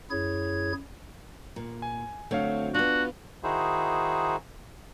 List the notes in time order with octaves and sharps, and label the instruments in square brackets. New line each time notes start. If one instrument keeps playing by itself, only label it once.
[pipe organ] F#2 E4 G#4 C#5 G#6
[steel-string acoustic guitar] A#2
[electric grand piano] G#5
[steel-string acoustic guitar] D2 F#3 C4 [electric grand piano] A3 C#5 F5
[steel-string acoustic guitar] B3 F4 [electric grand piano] D4 [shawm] F#4
[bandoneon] D#3 D#4 E4 F#4 G#4 C5